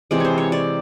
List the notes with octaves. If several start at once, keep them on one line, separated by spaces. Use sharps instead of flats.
C3 E3 G#3 D5
C5 C#5
C#5
D5